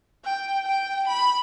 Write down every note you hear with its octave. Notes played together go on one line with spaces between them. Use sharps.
G5
G5
B5